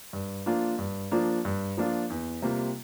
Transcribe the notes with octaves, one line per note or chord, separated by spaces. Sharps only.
G2
F3 A#3 D4 F4
G2
F3 A#3 D4 F4
G2
F3 A#3 D4 F4
E2
C3 G3 A#3 F4